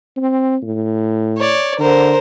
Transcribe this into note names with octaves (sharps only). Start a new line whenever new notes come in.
C4
A2
C#5 D5
D3 A#4 C5